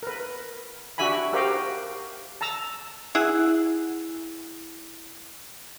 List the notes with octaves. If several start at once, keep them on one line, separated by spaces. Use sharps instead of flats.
A#4 B4
D4 F#4 G4 E5 G#5 B5
F#4 G4 A#4 C5 F5 G5
A5 A#5 E6
E4 G#4 F#5